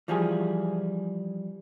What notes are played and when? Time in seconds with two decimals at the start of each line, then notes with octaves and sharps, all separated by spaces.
0.08 E3 F3 G3 G#4